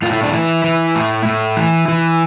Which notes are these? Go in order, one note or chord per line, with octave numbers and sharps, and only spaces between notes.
A2 F4
E4
D4
E3 E4
E3
A2
A2
E3
E3